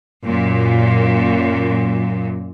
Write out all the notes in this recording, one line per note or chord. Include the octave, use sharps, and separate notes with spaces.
F#2 A#2